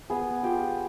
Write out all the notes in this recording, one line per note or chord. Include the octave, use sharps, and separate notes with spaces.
B3 G#4 G#5
F4 G4 G5